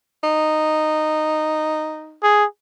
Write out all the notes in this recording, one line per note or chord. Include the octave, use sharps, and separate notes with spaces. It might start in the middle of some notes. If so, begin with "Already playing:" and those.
D#4
G#4